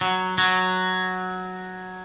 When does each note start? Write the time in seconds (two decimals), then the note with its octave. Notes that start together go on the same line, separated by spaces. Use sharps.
0.01 F#3
0.38 F#3